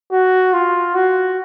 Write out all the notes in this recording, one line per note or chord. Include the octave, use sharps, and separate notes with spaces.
F#4
F4
F#4